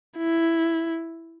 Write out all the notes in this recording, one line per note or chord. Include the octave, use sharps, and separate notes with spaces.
E4